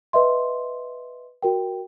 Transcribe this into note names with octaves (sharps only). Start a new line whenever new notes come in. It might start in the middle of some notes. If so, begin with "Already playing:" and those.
B4 D#5 E5 C6
F#4 A#4 G5